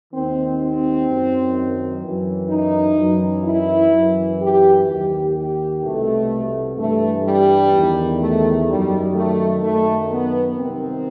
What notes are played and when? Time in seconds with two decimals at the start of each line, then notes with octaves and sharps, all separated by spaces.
0.12 D#2 D#3 C4
0.60 C4
1.07 F#2 D#3
2.02 F#2 E3
2.49 D#4
2.97 F#2 E3
3.44 E4
3.92 F#2 E3
4.40 G4
4.88 D#2 D#3 G4
5.36 G4
5.83 C2 B2 A3
6.77 G2 E3 A3
7.25 G3
7.73 E2 D#3
8.20 A3
8.68 F#2 D#3 G3
9.15 A3
9.63 F#2 D#3 A3
10.10 B3
10.58 C2 C3 D#3 C4